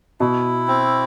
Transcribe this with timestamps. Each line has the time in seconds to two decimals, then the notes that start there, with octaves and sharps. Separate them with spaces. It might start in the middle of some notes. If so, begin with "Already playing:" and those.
0.20 B2 E4
0.68 C4